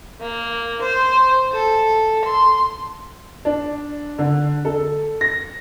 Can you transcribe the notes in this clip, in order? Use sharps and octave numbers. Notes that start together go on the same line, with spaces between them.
A#3
C5
A4
C6
D4
D3
A4
A#6